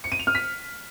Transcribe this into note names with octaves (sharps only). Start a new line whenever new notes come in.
C#7
D#7
F7
F6
B6